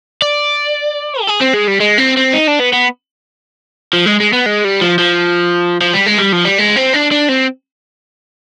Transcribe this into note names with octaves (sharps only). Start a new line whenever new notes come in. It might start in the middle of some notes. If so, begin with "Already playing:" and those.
D5
G4
G#4
C4
G#3
G3
G#3
C4
C4
D#4
D4
B3
B3
F3
G#3
G#3
B3
G#3
G3
F3
F3
F3
G3
G#3
G3
F3
G3
G#3
C4
D4
D4
C4